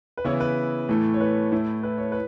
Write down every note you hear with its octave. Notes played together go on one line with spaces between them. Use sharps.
B4
C#3 E3 B3 E4 C#5
B4
A2 E3 A3
C#5
B4
A2 A3 E4
B4
C#5
B4